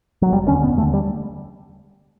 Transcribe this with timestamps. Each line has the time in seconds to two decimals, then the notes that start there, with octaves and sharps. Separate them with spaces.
0.22 F#3
0.32 F1 G3
0.48 D#2 D3 C#4
0.63 F1 B3
0.77 D#2 A3
0.82 D3
0.93 G3